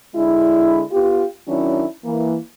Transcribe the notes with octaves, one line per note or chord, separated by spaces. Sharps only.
D3 G#3 D4 E4
B3 F4 G4
D#3 F#3 C#4 D4 E4
E3 A#3